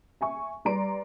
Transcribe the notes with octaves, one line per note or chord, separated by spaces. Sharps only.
E5 G#5 C#6
G3 B4 D5 A#5 C6 D7